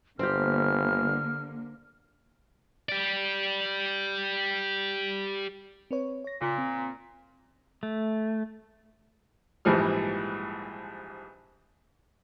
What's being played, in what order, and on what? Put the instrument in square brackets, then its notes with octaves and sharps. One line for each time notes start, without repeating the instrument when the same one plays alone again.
[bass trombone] G1 [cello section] D3 A#3 [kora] C4 G4 [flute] F6
[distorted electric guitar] G4 D5
[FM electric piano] C4 B4 C#5
C#5 A#6
[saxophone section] A#2 [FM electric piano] C#3 F4
[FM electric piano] C4
[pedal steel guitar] A3
[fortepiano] A#1 G#2 E3 F3 G3 F6